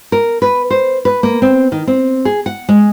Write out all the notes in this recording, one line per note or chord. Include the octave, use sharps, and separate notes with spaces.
A#4
B4
C5
B4
A#3
C4
D#3
C4
G#4
F#5
G#3